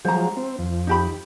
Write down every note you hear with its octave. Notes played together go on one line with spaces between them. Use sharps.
F3 F#3 G#3 C5 A#5
C4
F2
D#4 G4 B5